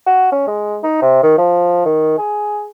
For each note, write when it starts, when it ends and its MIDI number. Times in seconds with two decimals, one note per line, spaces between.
0.07 0.31 66
0.32 0.47 61
0.47 0.78 56
0.83 1.01 63
1.02 1.21 48
1.23 1.36 51
1.38 1.84 53
1.85 2.17 51
2.18 2.66 68